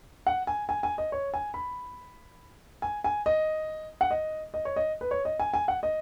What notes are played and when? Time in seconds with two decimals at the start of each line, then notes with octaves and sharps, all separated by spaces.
0.27 F#5
0.47 G#5
0.69 G#5
0.83 G#5
0.98 D#5
1.12 C#5
1.34 G#5
1.54 B5
2.82 G#5
3.04 G#5
3.26 D#5
4.01 F#5
4.11 D#5
4.54 D#5
4.65 C#5
4.76 D#5
5.01 B4
5.11 C#5
5.25 D#5
5.40 G#5
5.54 G#5
5.68 F#5
5.83 D#5